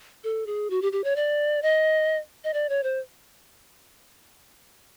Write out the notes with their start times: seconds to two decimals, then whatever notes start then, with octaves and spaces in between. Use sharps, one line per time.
0.24 A4
0.46 G#4
0.70 F#4
0.82 G4
0.92 G4
1.04 C#5
1.16 D5
1.62 D#5
2.44 D#5
2.54 D5
2.69 C#5
2.83 C5